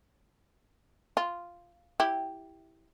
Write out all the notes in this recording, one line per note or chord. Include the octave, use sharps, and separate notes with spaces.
F4
E4 G4